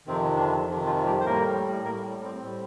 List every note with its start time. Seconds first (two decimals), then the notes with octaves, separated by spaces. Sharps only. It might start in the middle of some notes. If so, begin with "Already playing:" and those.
0.07 F2 C3 D#3 C4
0.36 D3 D4
0.66 F2 C3 D#3
0.85 F3 F4
1.06 G3 G4
1.20 C5
1.25 A2 G3 A#3 A#4
1.84 A2 G3 A#3 A#4
2.24 C4
2.42 A2 G3